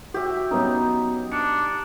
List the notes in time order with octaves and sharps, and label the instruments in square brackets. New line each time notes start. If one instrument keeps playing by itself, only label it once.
[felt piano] F#4 [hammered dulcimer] G4 E5
[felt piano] F#3 B3 C#4 [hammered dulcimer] D#4
[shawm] D4 [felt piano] C#7